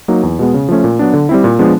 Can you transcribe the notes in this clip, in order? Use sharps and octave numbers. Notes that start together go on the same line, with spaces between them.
F#3 A#3 D#4
E2
B2 G#3 B3
C#3
F3 A3 C#4
A#2
F#3 B3 D4
D3
G3 C4 E4
A#2
F3 G#3 B3 D4